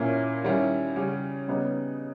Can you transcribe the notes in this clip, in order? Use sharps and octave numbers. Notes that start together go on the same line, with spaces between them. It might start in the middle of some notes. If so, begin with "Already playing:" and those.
Already playing: A#2 A#3 C#4 E4
D#3 G3 C#4 E4
C#3 G3 C#4
C#3 G3 B3 D#4